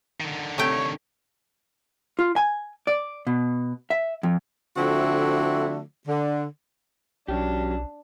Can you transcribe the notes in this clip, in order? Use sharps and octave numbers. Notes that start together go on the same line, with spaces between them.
D3 D#3
C3 A3 C#5 G5
F4
G#5
D5
B2
E5
F2
D3 F3 A3 C4 E4 F#4
D3
B1 F#3 C#4 D4 G4